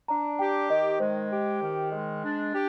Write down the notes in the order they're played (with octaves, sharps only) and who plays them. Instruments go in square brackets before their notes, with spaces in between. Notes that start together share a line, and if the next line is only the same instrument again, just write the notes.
[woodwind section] D4 [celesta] A#5
[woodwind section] G4 [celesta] G5
[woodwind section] D#3 [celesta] D#5
[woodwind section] G#3 [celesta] C5
[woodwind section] G4
D#3
G#3
D4
G4